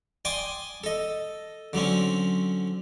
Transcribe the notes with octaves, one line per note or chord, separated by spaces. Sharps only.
D5 G5 G#5 C6 D6 D#6
A4 D#5
D3 F#3 C4 C#4